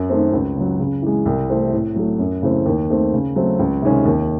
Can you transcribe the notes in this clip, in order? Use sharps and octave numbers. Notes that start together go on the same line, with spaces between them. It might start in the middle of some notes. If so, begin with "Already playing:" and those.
Already playing: F#2
D#3 A3 C4
C#2
C#3 F#3
C#3
E3 G#3
C2
C3 E3 A3 C4
A2
F#3 A3
F#2
C#3 E3 A3 C4
D#2
D#3 A3 C4
C#3
F#3 A3 C4
C#2
C3 D#3 G#3 C#4
D#2